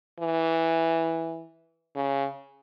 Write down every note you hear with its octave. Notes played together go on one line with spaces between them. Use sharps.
E3
C#3